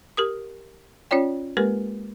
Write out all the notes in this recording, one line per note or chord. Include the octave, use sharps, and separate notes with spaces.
G4 A#4 D#6
C#4 F4 C#5 D5 G5
G#3 A#3 G4 A#4 B4